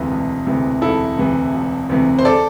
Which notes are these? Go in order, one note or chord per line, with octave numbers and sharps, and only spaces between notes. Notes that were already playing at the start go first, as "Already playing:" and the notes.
Already playing: E1 D2 C3 E3
E1
D2 C3 E3
E1 E4 A4
D2 C3 E3
E1
D2 C3 E3
C5
A4 D5